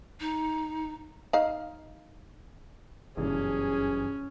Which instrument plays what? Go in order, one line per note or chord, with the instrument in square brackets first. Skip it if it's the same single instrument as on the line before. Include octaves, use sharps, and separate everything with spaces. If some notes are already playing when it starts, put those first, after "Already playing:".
[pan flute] D#4
[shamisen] D#4 F5
[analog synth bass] F#1 [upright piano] G2 B2 E3 [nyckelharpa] C#4 [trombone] G#4